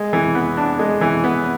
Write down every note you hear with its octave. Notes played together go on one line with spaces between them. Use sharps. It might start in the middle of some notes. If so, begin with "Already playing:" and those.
Already playing: G#3
E3
B3
D4
G#3
E3
B3